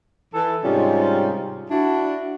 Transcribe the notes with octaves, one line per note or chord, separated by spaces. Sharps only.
E3 A4
G#2 C3 G3 C#4 D#4 F4
D4 E4 F#4